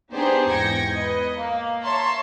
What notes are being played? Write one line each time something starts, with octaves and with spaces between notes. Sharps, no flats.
B3 D4 D#4 G4 G#4 C5
E2 G#2 G5 G#6 A#6 C#7
B4 D#5
A#3
C#5 E5 A5 A#5 C6 C#6